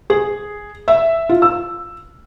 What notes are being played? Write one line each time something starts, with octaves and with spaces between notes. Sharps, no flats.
G#4
E5
F4
E6